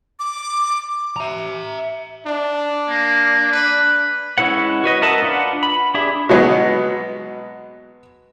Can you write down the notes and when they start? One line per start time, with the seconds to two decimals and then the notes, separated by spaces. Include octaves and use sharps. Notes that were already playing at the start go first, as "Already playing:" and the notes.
0.19 D6
1.16 E5 A#5
2.26 D4
2.89 A#3
3.52 B4
4.38 G#3 C#4 E4 B4 F#5
4.84 F#4 B4 D#5
5.02 A#4 D#5 E5 F#5 A5
5.22 D4 F4 B4 F#5
5.63 B5
5.94 D4 G4 G#4 E5
6.29 B2 F#3 G#3 B3